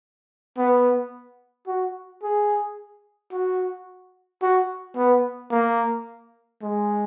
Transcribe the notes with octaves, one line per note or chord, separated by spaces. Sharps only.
B3
F#4
G#4
F#4
F#4
B3
A#3
G#3